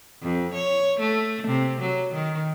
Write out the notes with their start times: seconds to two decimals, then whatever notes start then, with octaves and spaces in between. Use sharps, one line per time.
0.22 F2
0.54 C#5
1.00 A3
1.47 C3
1.81 F#3
2.14 D#3